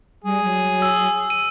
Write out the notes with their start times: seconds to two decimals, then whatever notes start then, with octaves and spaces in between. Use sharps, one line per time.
0.24 G3 G#4
0.44 F#3
0.82 E6
1.30 D#7